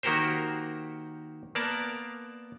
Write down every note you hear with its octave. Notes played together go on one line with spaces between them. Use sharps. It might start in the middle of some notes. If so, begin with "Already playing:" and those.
D#3 A#3 F#4 G4 A#4 C5
A#3 B3 A#4 D5 A5